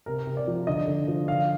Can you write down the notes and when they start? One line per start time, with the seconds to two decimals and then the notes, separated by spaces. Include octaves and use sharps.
0.06 C3 A#4
0.27 C3
0.37 D5
0.47 F3
0.67 D3 D#5
0.87 D3
1.08 F3
1.28 D3 F5